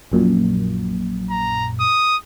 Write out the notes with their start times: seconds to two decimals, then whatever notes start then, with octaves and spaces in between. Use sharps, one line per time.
0.12 A#1 F#2 A#2
1.31 A#5
1.80 D#6